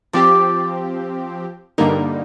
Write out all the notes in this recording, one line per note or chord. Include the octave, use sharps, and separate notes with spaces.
F3 C4 G4 D5
G2 D3 G3 A#3 D#4 A#4